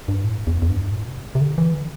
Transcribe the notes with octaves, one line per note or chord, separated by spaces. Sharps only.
G2
A2
E2
E2
G2
A2
C3
C3
D3
E3
D3